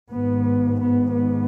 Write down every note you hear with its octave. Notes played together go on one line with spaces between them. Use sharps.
G#1 G#2 B3
B3
B3